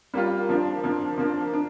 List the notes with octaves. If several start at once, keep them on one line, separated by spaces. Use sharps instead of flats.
G3 A#3 F4
F3 A#3 D4
F3 A#3 D4
F3 A#3 D4
D4